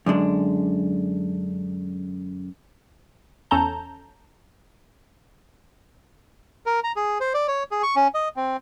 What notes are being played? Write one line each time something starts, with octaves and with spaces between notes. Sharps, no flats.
F#2 D3 G#3 D4
E2 C#4 A4 A5 A#5 G6
A#4
A#5
G#4
C5
D5
C#5
G#4
C#6
C#4
D#5
C4